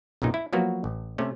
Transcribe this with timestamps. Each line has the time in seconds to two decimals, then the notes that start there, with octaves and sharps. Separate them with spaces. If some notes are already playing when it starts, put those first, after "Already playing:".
0.22 B1 F#2 A#2 D#4
0.34 E4
0.53 F3 F#3 A#3 B3 F#4
0.84 A1
1.18 C3 A3 C#4